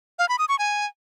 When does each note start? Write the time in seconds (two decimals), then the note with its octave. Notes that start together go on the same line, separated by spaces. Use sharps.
0.19 F5
0.29 B5
0.39 D#6
0.49 C#6
0.59 G#5